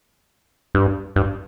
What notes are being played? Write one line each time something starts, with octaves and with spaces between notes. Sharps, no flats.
G2
G2